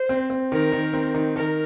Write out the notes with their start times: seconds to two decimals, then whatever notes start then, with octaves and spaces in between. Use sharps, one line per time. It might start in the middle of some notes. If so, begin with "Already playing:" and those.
Already playing: C5
0.09 C4
0.30 C4
0.51 D#3 A#4
0.72 D#3
0.94 C4
1.14 D#3
1.36 D#3 A#4